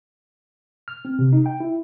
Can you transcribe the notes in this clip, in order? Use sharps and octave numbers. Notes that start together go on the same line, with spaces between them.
F6
C4
C3
D#4
G5
E4